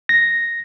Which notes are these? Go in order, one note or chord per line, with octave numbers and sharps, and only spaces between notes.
A#6